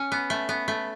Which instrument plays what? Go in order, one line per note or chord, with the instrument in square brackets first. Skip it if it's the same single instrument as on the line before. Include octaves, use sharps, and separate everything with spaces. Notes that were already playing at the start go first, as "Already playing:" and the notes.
Already playing: [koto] C#4
B3
A3
B3
A3